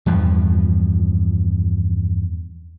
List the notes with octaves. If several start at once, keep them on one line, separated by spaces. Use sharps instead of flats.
E2 G2 F3